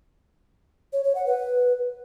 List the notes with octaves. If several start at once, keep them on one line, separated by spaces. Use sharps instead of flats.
C#5
C#5
F#5
B4